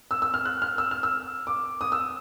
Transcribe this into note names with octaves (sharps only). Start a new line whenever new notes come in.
E6
E6
F6
F#6
F6
E6
F6
E6
D6
D#6
E6